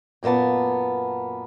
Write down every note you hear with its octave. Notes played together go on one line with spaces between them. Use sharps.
F#2 A#2 A#3 B3 A5